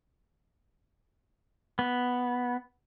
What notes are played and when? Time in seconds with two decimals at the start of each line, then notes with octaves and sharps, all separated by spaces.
1.79 B3